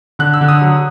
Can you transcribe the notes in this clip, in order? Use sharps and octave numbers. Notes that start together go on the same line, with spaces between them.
D3 F#6
E6
D3
D#6
F#3